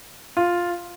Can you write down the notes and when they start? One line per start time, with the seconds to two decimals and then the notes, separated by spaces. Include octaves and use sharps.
0.37 F4